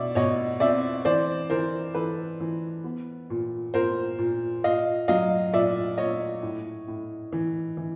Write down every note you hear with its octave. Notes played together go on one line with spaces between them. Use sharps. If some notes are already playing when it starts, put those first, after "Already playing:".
Already playing: B2 D5 E5
B2 C#5 D#5
C4 D5 E5
E3 C5 D5
E3 A#4 C5
E3 A4 B4
E3
B3
A#2
A#2 A#4 C5
A#2
A#2 D#5 F5
F#3 D#5 F5
A#2 D5 E5
A#2 C#5 D#5
A2
A2
E3
E3